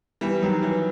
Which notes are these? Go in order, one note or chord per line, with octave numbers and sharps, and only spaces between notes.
E3 G3
D#3 F#3
E3